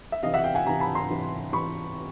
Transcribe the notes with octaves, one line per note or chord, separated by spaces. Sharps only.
E5
C3 E3 D#5 F5
E5 F#5
F5 G5
F#5 G#5
C3 E3 G#5 A#5
A5 B5
A#5 C6
C3 E3
C3 E3 B5 C#6